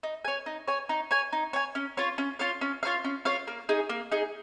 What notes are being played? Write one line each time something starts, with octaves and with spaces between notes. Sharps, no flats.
D#4
C#5 G#5
D#4
C#5 G#5
D#4
C#5 G#5
D#4
C#5 G#5
C#4
F4 C#5 F5
C#4
F4 C#5 F5
C#4
F4 C#5 F5
C#4
F4 C#5 F5
A#3
D#4 G#4
A#3
D#4 G#4